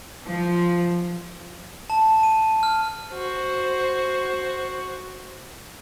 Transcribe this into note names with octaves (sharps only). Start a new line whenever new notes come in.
F3
A5
D#7
F6
F#4 C5